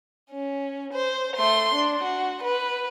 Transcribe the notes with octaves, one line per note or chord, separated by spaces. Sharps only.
C#4
C5
A3 C6
D4
F#4
B4